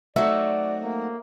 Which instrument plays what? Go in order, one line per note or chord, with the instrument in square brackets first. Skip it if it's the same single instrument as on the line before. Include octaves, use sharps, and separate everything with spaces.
[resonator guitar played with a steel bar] F#3 F#4 [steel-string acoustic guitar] A3 C4 D#4 [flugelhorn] D5 [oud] E5
[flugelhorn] A#3